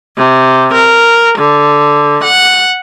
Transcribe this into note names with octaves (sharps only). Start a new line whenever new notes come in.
C3
A#4
D3
F#5